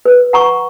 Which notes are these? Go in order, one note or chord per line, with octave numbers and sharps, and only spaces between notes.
B4
F#5 A#5 C#6